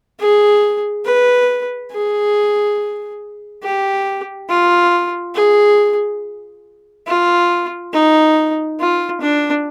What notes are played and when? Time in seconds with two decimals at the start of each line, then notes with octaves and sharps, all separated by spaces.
0.20 G#4
1.04 B4
1.92 G#4
3.62 G4
4.49 F4
5.35 G#4
7.07 F4
7.93 D#4
8.79 F4
9.21 D4